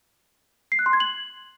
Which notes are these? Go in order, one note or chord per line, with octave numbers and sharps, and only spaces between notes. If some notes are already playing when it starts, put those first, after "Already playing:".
C7
F#6
C6
G#6
F#7